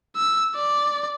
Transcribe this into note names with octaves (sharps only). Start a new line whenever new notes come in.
E6
D5